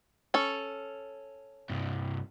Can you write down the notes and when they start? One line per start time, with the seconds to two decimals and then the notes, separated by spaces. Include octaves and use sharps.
0.34 C#4 A4
1.69 C2 G2